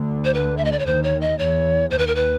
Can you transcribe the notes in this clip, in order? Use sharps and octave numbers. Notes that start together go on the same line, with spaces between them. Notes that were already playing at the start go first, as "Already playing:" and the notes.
Already playing: D2 D3
C5
B4
E5
D#5
D5
C#5
D#2 D#3 C5
C#5
D#5
E2 E3 C#5
D#2 D#3 C5
B4
A#4
B4